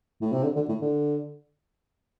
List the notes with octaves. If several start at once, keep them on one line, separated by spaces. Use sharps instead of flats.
A2
C3
D3
D3
A2
D3